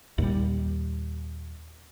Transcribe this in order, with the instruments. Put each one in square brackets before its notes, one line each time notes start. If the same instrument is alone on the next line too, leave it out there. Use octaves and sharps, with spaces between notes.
[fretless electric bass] D#2 A#2 G3